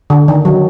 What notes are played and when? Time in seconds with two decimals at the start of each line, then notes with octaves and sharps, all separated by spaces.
0.10 D3
0.28 D#3
0.45 F#3